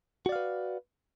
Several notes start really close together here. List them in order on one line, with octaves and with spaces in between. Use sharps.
F#4 D5 F5 B4